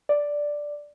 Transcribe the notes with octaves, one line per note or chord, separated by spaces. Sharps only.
D5